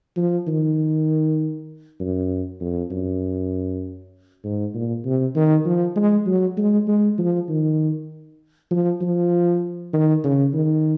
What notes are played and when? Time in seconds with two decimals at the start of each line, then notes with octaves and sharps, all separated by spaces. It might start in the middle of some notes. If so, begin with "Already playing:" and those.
0.16 F3
0.47 D#3
2.00 F#2
2.61 F2
2.91 F#2
4.44 G#2
4.74 A#2
5.05 C3
5.36 D#3
5.66 F3
5.96 G#3
6.26 F#3
6.57 G#3
6.88 G#3
7.18 F3
7.49 D#3
8.71 F3
9.01 F3
9.93 D#3
10.24 C#3
10.54 D#3